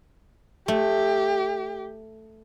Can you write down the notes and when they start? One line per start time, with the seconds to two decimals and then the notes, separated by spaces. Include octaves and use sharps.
0.68 A3 G4